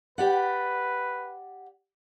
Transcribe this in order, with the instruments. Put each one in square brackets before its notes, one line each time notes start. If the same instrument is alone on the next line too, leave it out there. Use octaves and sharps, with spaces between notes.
[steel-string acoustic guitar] G4 D5 F#5 [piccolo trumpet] B4